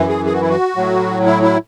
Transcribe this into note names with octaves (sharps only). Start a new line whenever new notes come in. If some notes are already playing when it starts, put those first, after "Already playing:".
Already playing: F#2 E3
G#4
G#4
F#4
E4
F#4
A2 F#3
E4
E4